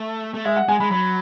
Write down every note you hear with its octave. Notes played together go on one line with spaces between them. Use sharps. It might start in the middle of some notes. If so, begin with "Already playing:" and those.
Already playing: A3
A3
G#3 E5
F#5
G#3 G#5
G#3 B5
F#3 B5